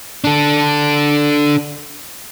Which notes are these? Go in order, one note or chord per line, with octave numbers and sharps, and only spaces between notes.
D4 A4